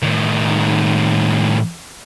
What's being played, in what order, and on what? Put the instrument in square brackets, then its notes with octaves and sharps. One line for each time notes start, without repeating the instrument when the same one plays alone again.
[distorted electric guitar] A2 D#3